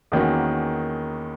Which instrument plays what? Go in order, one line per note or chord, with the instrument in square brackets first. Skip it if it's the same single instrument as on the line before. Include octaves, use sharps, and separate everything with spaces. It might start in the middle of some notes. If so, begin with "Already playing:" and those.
[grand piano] E2 D#3 A#3 C#4 F#4